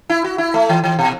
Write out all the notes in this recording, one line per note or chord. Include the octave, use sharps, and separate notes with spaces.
E4
F#4
E4
A3
E3
E3
B2